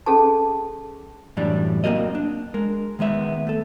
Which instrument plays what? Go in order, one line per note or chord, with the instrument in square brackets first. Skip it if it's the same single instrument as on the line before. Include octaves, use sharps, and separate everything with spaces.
[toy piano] C#4 G#4 A4 A5
[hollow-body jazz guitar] F#2 A2 E3 G3 D4
A#3 C4 F#4 A#4 D#5
D4
G#3 A#4
D#3 G#3 B3 E5
A3 A4